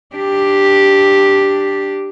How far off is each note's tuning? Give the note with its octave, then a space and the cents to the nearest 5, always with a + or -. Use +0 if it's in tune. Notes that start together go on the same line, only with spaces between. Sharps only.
D4 +0 G4 +0